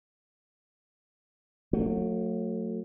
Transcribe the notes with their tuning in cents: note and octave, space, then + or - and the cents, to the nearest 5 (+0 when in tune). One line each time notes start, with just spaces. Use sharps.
F#3 -30 A3 +25